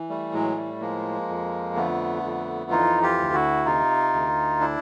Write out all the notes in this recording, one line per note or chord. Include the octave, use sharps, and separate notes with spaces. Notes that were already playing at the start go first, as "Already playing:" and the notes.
Already playing: E3
G3 A3
A2 F#3 G#3
G3 A3
F3 G#3 A#3
F2
D3 A3 B3
F2
E3 D#4 F4
F4 G4
D2
E4 F#4
C3 D#4 F4
D2
D4 E4